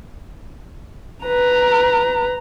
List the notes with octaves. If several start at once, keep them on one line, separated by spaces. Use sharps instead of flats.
B4 A#5